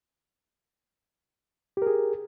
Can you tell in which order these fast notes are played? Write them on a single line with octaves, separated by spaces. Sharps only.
G4 A#4 G#4